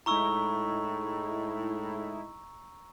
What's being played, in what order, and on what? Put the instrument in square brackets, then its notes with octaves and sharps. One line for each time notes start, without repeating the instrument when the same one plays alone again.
[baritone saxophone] A2 [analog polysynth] G#3 D#4 E4 [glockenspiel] A#5 C#6 E6